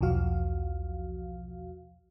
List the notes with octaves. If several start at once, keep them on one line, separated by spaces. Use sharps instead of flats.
B1 E2 F3 F#4 F5